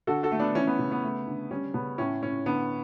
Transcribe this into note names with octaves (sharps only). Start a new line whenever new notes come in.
D3 F#4 A4
F#4 A4
A3
B3 D4
E3 C#4
B3
C#3
B3
A3
D3
G3 C#4
C#3 B3
A2 C#4
A2 C#4
D3 B3